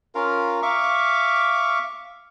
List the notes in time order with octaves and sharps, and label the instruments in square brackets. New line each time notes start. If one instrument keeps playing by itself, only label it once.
[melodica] C#4 F4 A#4 F5
E5 F5 C#6 D6